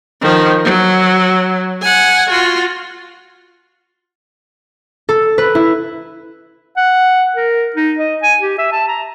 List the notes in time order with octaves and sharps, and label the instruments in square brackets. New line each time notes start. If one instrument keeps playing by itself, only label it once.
[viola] D#3 F3
F#3
F#5 G#5
F4 F#4
[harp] A4
B4
E4
[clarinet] F#5
A#4
D#4
D#5
G#5
G4
E5
A5
A#5